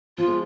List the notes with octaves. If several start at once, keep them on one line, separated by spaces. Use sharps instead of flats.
F3 F4
G#3